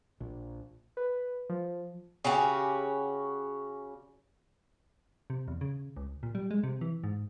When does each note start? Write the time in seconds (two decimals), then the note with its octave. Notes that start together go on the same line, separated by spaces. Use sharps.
0.20 A#1
0.97 B4
1.49 F3
2.24 C#3 C#4 F#4 G4
5.30 C3
5.48 E2
5.61 C#3
5.97 C#2
6.23 A#2
6.35 G3
6.51 G#3
6.64 C3
6.81 E3
7.04 G#2